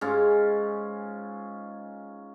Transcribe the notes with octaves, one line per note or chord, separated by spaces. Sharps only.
G#2 C#4 F4